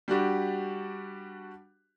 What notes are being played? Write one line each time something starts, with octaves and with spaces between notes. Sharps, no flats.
G3 D4 F#4 G4